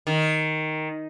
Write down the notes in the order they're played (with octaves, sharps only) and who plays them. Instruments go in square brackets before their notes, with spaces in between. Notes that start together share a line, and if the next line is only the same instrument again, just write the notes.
[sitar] D#3